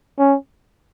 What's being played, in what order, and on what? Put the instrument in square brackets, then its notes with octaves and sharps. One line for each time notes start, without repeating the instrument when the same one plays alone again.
[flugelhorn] C#4